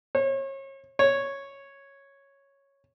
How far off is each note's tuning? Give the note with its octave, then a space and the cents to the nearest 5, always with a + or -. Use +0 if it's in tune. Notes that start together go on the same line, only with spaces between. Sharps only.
C#5 -35
C#5 -5